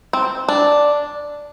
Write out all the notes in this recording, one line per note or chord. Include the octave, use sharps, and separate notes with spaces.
C4
D4